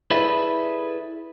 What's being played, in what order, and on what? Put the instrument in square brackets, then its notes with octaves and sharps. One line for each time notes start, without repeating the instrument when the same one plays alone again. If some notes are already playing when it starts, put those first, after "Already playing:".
[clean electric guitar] E4 G#4 A4 B4 D5 E5